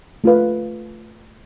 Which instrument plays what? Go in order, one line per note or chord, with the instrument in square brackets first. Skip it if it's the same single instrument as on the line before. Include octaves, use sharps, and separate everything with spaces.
[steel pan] A3 F4 B4 F5